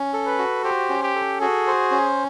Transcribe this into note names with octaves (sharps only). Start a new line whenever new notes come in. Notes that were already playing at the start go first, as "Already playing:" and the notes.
Already playing: C#4
A4
B4
F#4
G4 C5
C#4
G4
A4
F#4 G#4
C5
C#4